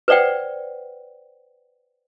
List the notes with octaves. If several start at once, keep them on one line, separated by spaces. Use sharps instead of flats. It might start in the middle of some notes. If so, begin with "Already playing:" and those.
B4 C5 D5 F#5 G5